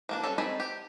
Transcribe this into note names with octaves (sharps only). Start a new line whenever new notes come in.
F3 A#3 D4
G3 C#4 A4
C4 D#4 A4 G#5 B5
G4